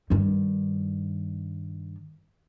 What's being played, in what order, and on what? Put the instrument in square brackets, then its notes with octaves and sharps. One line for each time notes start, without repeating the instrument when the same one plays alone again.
[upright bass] G2 D#3